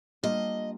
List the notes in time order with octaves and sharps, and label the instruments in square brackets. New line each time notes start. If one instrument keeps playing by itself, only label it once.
[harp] G3 A#3 D4 F4 [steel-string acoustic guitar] D#5